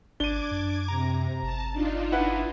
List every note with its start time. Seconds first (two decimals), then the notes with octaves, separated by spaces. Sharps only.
0.20 G#1 D4 D6 G#6 D#7 G7
0.51 F#2
0.88 C3 A#5
1.43 G1 A5
1.73 D4 D#4 F4
2.12 E4 B4 F#5